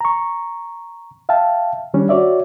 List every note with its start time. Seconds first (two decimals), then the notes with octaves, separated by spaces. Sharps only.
0.01 A#5 C#6
1.29 E5 F5 G5 A5
1.94 D#3 G3 C#4 D4
2.09 F#4 C#5 D5 E5